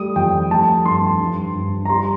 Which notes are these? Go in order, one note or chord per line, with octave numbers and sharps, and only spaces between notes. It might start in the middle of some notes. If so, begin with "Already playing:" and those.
Already playing: G3 A3 D#6
F2 G5
A3 A5
G2 C6
G2
G2
A#5
G3 C6